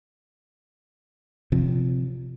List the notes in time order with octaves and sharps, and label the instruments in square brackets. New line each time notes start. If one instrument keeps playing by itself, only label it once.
[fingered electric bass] C3 F3